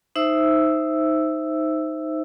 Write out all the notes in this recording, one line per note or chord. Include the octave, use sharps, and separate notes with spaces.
D#4 C5 E5 E6